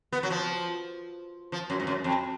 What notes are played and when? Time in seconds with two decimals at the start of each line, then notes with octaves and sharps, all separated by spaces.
0.12 B3
0.23 F#3
0.30 F3
1.52 F3
1.70 F#2
1.80 G#2
1.87 F#2
2.04 F2